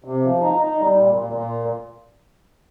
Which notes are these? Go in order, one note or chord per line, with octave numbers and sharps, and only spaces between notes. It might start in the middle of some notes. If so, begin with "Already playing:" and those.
C3
F3
D#4
D#4
G3
A#2
A#2
A#2